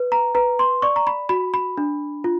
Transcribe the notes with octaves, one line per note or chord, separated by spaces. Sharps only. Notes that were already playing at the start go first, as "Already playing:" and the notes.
Already playing: B4
A#5
B4 A#5
C6
D5 C#6
A#5
B5
F#4 B5
B5
D4
F4